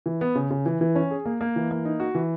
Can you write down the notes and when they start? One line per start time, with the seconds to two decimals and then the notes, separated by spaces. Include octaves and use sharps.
0.06 E3
0.21 B3
0.35 C#3
0.51 C#3
0.66 E3
0.81 E3
0.95 C#4
1.11 G#4
1.25 A#3
1.41 A#3
1.56 E3
1.71 A#3
1.85 D#4
2.00 F#4
2.15 E3